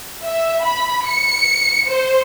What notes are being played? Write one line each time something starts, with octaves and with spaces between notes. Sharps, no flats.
E5
B5
C#7
C5